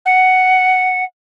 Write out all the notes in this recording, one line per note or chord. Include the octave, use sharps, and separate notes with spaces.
F#5